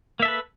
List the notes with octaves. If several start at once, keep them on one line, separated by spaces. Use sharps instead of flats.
A#3 A4 B4 E5